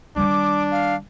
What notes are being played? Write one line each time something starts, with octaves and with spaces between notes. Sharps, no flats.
D#3 G3 D4 D6
F5